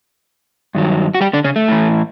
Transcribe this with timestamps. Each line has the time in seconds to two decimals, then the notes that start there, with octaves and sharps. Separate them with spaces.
0.75 G2 D#3 F#3
1.15 F#4
1.21 G3 G4
1.33 D3 D4
1.44 C#3 C#4
1.56 A3
1.68 A2 E3